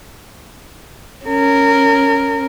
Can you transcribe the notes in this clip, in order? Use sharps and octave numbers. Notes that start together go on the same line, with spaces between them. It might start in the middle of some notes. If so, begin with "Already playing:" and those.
C#4 A#4